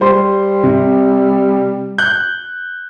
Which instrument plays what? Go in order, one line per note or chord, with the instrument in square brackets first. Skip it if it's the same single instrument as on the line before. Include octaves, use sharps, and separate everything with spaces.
[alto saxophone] G3 [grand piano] C5 C6
[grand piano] C3
F#6 G6